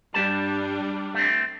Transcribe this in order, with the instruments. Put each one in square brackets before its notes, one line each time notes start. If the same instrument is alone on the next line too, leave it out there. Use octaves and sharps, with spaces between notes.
[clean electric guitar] G2 G4 A5 [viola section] G3 D4
[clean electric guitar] A3 C4